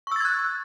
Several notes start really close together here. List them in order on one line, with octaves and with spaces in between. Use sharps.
C#6 E6 A6 G#6 F#6